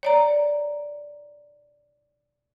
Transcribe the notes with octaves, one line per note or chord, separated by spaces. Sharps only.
C#5 D5 A#5